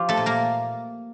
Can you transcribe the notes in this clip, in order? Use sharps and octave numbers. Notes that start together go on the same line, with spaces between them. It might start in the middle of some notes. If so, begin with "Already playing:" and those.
Already playing: F3 F4 G4
A3 A4
A#2
A#3 A#4